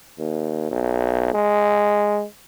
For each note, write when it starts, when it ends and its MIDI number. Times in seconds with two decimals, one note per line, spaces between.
0.19 0.69 39
0.71 1.30 35
1.34 2.25 56